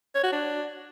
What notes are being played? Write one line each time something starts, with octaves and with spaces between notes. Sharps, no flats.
C#5
F#4
D4